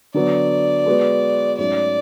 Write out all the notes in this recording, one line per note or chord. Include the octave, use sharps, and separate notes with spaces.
D3 F#3 B3 D5
G#3 B3 F#4 B4
G#2 F#3 A3 C#4 D5